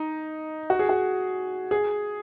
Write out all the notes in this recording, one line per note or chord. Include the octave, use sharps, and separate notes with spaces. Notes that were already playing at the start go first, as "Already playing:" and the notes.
Already playing: D#4
F#4
G#4
F#4
G#4